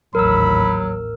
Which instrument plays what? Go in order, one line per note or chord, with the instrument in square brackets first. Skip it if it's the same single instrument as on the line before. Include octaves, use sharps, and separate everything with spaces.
[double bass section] A1 D#2 G#2 [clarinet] F#3 [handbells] A#4 E6 [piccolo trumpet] B5